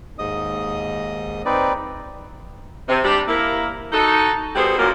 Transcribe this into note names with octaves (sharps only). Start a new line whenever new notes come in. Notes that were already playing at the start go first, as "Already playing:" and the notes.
D#2 G#2 D#5 D#6
C4 D#4 B4 D5
C3
G3 D4 G4
A#3 E4 A#4
D#4 F#4 A4
B2 G3 B3 G#4 A4 C5
F#2 A#2 A#3